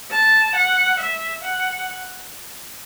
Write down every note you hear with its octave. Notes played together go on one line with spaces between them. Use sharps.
A5
F#5
E5
F#5